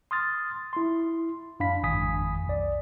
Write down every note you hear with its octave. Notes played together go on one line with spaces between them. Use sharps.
C6 D#6 F6 A6
E4 C6
F#2 D4 F5 B5 B6
G#1 F2 G#5 D#6 B6
B1 D5